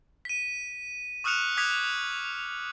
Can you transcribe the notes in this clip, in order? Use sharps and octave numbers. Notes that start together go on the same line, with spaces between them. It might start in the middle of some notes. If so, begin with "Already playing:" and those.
B6 D#7
C#6 D#6 F6 F#6 C#7 F7
D6 D#6 F#6 G#6 B6 F7